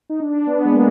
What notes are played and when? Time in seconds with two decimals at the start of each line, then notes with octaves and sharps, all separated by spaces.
0.10 D#4
0.20 D4
0.47 B3
0.65 G#3
0.73 A#3